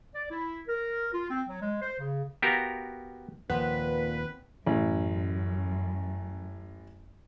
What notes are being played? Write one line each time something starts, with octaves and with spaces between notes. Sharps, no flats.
D5
E4
A#4
F4
C4
F#3
G#3
C5
C#3
B3 F#4 G4 A#4 F5 A#5
D#2 A#2 F3 B3 C4 B4
A1 F#2